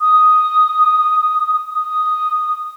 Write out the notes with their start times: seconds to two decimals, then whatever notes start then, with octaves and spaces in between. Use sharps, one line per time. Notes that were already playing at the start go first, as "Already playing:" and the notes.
0.01 D#6
1.74 D#6